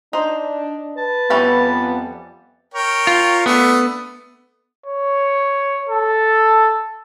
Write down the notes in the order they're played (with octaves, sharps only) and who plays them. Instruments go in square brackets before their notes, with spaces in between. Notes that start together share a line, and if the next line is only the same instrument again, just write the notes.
[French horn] D4 [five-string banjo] D#4 C5
[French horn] B4 [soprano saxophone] A5
[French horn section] F2 B3 [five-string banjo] E3 G3 C#4
[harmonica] A#4 C#5 G5
[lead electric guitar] F4
[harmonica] A3 D4 [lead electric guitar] B3
[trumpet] C#5
A4